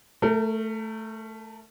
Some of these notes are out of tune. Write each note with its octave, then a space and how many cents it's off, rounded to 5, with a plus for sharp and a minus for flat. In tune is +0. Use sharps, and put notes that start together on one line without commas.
A3 +0 A#4 -35